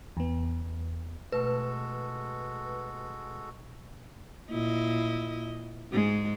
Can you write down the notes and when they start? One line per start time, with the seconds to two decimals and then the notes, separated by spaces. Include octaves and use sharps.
0.17 E2 B3
1.32 B2 G#3 A3 F#4 A4 B4
4.50 A#2 E4 D#5
5.91 G#2 G#3